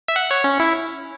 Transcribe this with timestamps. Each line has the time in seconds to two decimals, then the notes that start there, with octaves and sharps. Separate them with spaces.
0.08 E5
0.16 F#5
0.31 C#5
0.44 C#4
0.60 E4